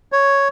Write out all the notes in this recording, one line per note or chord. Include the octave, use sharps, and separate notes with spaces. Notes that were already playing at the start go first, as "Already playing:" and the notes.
C#5